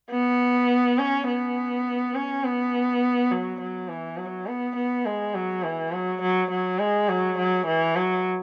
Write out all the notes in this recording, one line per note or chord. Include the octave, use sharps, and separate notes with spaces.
B3
C#4
B3
C#4
B3
F#3
F#3
E3
F#3
B3
B3
G#3
F#3
E3
F#3
F#3
F#3
G#3
F#3
F#3
E3
F#3